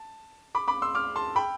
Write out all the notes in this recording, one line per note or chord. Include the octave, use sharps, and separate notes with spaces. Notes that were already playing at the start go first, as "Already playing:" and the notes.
Already playing: A5
B5 D6
B5 D6
C6 E6
D6 F6
A5 C6
G5 B5